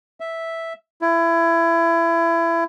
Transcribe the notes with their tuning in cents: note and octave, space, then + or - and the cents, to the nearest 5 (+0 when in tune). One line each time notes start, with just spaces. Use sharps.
E5 -5
E4 +25